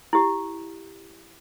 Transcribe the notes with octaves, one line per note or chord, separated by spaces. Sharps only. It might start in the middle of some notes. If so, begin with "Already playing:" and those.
E4 G4